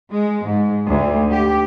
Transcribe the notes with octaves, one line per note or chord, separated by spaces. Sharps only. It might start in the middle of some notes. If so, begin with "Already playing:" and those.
G#3
G#2
D2
G4